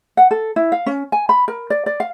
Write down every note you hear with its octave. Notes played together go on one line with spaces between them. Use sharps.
F#5
A4
E4
F5
C#4
G#5
B5
A#4
D5
D5
F5